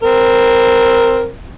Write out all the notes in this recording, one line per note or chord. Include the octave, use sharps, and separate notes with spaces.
C4 A#4